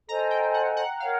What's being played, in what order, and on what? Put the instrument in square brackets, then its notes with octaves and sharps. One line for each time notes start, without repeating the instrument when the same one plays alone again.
[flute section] A4 C5 D#5 G#5 [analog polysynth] A#5
[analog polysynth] G5
F#5
F#5
[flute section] A#4 C#5 F#5 [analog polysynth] F5